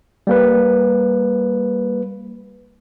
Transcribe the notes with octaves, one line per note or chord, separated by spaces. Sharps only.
G3 A#3 B4